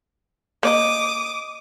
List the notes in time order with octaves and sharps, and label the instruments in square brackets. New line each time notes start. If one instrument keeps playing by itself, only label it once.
[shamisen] A#3 C#5 D#5 [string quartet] D6 D#6